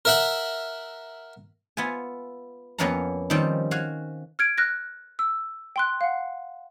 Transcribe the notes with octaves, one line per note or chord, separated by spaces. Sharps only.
A#4 E5 F#5
B3 F4 E5 G#5
F2 A#3 B3 C#4 F5 A#5
D#3 F3 G3 C4 C#4
F#4 F5 G#5
F6 G#6 D7
F6 F#6 A#6
E6
G5 C6 F#6
F5 F#5